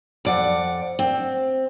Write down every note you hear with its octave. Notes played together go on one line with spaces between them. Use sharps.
F2 D5 F#5
C4